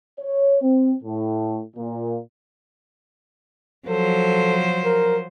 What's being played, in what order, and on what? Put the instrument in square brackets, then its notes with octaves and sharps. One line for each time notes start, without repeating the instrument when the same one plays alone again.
[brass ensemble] C#5
C4
A2
A#2
[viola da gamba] F3 F#3 C5 [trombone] A4
[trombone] A#4